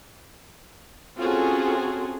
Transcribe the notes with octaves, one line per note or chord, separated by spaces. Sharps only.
C4 C#4 F4 F#4 G#4 A4